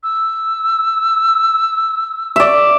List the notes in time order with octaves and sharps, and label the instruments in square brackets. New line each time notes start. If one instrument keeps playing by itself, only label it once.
[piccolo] E6
[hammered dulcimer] D5 E5